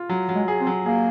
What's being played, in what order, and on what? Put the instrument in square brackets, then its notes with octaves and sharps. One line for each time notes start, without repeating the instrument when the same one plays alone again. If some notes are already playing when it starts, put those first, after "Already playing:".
Already playing: [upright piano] F4
F#3
F#3
[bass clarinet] G#3
[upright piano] G#4
[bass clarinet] C4
[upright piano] F#3
[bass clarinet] A#3 [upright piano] G#4